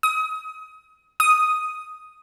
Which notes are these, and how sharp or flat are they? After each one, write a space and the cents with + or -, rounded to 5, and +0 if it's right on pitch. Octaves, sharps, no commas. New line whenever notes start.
D#6 +25
D#6 +0